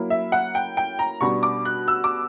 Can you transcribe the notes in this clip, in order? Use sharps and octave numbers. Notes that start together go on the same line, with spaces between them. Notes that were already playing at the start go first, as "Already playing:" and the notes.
Already playing: F#3 A#3 E4
E5
F#5
G5
G5
A#5
B2 G3 B3 D4 C#6
D6
F#6
E6
D6